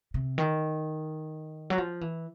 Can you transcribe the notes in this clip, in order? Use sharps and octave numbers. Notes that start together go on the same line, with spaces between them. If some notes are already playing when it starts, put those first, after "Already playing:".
C3
D#3
F#3
F3
E3